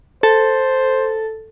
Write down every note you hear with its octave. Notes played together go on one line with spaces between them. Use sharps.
A4 C5